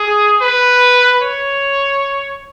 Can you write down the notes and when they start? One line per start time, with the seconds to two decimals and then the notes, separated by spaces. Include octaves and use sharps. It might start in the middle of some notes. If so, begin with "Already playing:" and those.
Already playing: G#4
0.41 B4
1.22 C#5